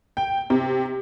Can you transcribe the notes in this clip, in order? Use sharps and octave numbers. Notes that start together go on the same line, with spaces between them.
G5
C3